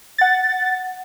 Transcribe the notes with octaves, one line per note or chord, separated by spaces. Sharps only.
F#5 A6